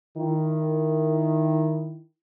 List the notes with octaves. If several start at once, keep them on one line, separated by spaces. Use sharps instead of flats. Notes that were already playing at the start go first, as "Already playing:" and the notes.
D#3 E4